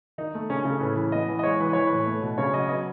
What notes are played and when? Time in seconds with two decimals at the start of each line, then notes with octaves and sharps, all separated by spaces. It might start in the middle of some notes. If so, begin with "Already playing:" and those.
0.18 D#3 D#4
0.35 A3
0.50 C#3 C#4
0.60 C#4
0.65 C#3
0.70 A4
0.80 A2 B4
0.96 E3
1.12 B3 D#5
1.28 E3
1.39 D#5
1.43 G#3 C#5
1.60 E3 B4
1.73 E3 C#5
1.87 A2 B4
2.07 A3
2.22 B2
2.38 C#3 C#5
2.54 F#3 D#5
2.69 B3 D#5